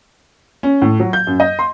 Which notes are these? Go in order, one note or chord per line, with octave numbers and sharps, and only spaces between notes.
C#4
A2
F#3
G6
F#2
D#5
C6